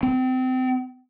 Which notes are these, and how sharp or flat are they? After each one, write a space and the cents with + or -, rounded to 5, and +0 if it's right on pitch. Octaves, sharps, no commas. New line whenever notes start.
C4 -30